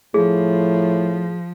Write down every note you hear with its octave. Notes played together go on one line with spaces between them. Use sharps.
A2 F3 G#4